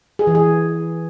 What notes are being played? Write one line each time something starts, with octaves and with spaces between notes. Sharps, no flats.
G#4
E3
G#4